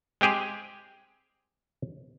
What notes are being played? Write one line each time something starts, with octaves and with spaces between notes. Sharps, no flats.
G#3 C4 G4 G#4